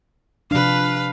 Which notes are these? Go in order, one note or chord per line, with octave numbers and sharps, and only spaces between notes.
C3 F3 D4 B4 F5